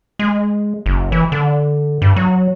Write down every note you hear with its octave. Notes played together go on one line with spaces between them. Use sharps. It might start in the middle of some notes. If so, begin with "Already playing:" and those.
G#3
F#1
E3
D3
G2
F#3